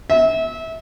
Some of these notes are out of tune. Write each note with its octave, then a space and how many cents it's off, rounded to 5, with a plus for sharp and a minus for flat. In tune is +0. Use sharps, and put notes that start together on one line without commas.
E5 -25